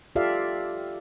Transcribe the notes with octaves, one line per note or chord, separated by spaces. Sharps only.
F4 G4 A4 D5 E5 F5